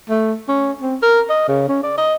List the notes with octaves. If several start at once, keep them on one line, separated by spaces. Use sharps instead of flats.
A3
C#4
C4
A#4
D#5
C#3
C#4
D5
D#5